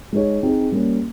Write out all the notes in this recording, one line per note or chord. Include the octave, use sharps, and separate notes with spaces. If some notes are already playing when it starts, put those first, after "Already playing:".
G#3 D#4 G#4 C#5
C4 D#4 G#4
G3 A#3 C#4